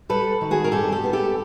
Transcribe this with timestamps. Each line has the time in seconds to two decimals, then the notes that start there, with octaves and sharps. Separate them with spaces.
0.09 G3 A4 B4
0.41 D#3
0.51 F#4 G#4
0.64 A#4
0.72 G2 G4 A4
0.92 G4 A4
1.04 B3
1.13 G4 A4